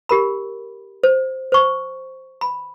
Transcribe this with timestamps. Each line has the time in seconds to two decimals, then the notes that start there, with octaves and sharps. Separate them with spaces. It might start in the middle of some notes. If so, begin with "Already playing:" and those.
0.09 G4 A#4 B5
1.03 C5
1.52 C5 C#6
2.41 B5